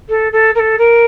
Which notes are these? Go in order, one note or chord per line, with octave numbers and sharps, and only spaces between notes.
A4
A4
A#4
A4
A#4